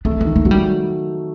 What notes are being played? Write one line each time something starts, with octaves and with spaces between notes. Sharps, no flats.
A3 D4
A#3
D#3
A3
F#3 G#3
G3